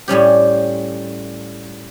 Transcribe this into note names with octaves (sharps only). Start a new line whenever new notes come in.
A2 G3 C#4 G4